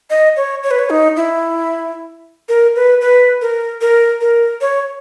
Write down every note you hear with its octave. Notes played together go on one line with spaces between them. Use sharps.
D#5
C#5
C#5
B4
C#5
D#4
E4
A#4
B4
B4
A#4
A#4
A#4
C#5